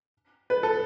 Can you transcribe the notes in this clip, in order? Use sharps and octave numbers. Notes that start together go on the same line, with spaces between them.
B4
A4